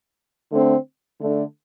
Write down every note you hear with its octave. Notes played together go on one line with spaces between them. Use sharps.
D3 A3 C4
D3 A3 D4